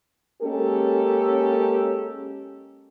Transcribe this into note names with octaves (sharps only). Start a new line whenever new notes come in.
G#3 A#3 C#4 G4 A4